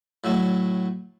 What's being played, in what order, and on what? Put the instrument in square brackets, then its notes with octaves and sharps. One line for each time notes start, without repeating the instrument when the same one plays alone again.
[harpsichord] A2 F#3 A3